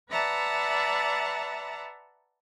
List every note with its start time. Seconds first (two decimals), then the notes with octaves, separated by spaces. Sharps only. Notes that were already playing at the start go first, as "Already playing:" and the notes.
0.10 B4 D5 E5 F#5 A5 A#5